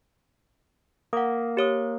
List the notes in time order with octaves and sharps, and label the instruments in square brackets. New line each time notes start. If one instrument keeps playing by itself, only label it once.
[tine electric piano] A#3 [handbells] F#5 D#6
[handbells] G4 C#5 D#6